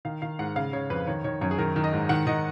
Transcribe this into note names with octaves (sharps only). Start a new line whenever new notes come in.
D#3 F5
D#3 F5
G#2 F#5
C#3 F5
C#3 C#5
F2 B4
D#3 C#5
D#3 C#5
F#2 C#5
G#4
D#3 A#4
D#3
D#5
G#2
D#3 F#5
D#3 D#5